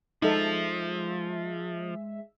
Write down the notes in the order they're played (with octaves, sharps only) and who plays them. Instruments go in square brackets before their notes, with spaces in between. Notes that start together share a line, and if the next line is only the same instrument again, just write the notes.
[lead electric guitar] F3 [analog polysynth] G#3 E5 [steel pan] D#4 A4